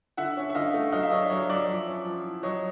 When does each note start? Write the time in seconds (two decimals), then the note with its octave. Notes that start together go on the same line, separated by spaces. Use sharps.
0.17 D3 E5 F#5
0.37 C#4
0.50 E5
0.55 D3 D#5 F5
0.74 A3
0.92 F#3 D#5 F5
1.03 E5
1.11 D4 C#5 D#5
1.30 F#3 C#5 D#5
1.49 F#3 D5 E5
1.68 F3
1.87 C#4
2.05 F3
2.24 E4
2.43 F#3 C#5 D#5